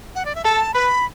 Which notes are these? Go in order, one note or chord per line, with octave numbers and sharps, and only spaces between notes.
F#5
D5
E5
A4 A5
B4 B5